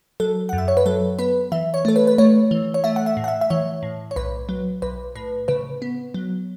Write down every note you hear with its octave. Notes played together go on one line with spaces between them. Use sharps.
F#3 A4
F#2 F#5
E5
C#5
B4
F#3 A4
B3 B4
E3 E5
C#5
A3 A4
B4
B4
A3 C#5
E3
C#5
A3 E5
F#5
E5
A2
F#5
E5
E5
E3 C#5
A2
C#5
B1 B4
F#3
B1 B4
A2 B4
C#3 B4
B3
F#3